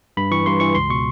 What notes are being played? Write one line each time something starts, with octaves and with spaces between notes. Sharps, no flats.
G2 B5
E3 C#6
G2 C6
E3 C#6
C#2 C6
B2 C#6